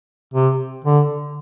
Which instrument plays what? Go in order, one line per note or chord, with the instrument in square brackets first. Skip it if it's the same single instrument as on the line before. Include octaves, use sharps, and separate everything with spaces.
[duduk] C3
D3